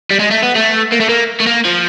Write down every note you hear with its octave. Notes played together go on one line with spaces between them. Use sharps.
G3
G#3
A3
B3
A3
A#3
A3
A#3
A3
A#3
F3